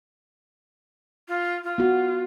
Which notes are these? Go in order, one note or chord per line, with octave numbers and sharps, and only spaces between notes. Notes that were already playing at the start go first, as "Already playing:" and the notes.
F4
F4
B3 F#4